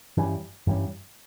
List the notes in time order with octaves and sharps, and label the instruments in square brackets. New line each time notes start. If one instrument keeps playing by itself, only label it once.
[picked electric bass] G2 E3 G3 C#4
G2 E3 G3 C#4